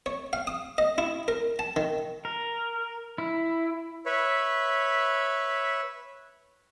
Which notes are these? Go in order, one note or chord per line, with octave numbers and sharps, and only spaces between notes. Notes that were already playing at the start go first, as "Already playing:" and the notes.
C#5
F5
D#6
D#5
E4
A#4
A5
D#3
A#4
E4
B4 C#5 E5